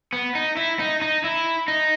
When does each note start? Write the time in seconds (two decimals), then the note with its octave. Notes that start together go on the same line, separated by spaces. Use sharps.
0.13 B3
0.35 D#4
0.57 E4
0.79 D#4
1.02 D#4
1.24 E4
1.68 D#4